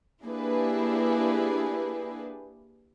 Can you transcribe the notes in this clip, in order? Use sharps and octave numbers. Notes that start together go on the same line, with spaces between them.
A#3 D4 E4 G4 G#4 B4